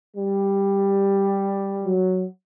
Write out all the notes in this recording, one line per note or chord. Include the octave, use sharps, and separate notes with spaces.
G3
F#3